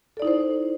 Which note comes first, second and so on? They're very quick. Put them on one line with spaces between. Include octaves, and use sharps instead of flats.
A4 D5 D#4 E4 C5